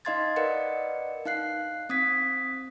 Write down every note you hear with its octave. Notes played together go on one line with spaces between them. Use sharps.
D#4 D#5 F5 C6 G#6 A6
A#4 B4 D5 D#5 F#5 C#7
D#4 F5 F#6 C7
C4 D#6 G#6 B6